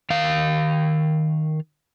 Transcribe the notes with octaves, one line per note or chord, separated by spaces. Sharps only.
D#3 F5